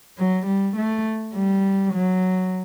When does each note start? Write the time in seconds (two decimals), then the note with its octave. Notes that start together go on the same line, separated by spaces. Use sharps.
0.18 F#3
0.47 G3
0.77 A3
1.35 G3
1.93 F#3